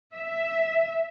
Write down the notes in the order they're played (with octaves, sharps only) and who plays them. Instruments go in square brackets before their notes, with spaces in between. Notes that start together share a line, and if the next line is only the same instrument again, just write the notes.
[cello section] E5